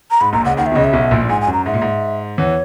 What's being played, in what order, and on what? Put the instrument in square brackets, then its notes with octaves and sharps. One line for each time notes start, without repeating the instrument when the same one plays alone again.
[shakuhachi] A#5
[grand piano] G#2 [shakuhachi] B5
[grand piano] A#1 A#2 [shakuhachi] A#5
[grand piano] C#2 C#3 [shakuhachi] F#5
[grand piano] D#2 D#3 [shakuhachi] F#5
[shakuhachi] E5
[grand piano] B2
[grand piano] C#2 C#3 [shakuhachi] D#5
[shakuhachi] E5
[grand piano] B1 B2
A#1 A#2
A#2
[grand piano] G#2 [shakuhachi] G#5
[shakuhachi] G#5
[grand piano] F#2
[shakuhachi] A#5
[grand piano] G#2 [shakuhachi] E5
[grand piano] A#2
G#2
[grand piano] E2 E3 [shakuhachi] C#5